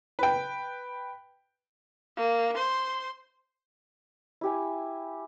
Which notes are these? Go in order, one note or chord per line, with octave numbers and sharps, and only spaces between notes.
B4 G5
A#3
C5 C6
E4 G4 G#5